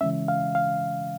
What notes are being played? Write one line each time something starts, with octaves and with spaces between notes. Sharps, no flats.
C#3 E3 G#3 C#4 E5
F5
F5